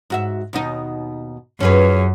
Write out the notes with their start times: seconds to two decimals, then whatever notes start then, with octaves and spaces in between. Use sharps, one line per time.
0.10 G#2 F#4 E5
0.53 D#2 B2 D#4
1.60 F#2 C#4 G#4 B4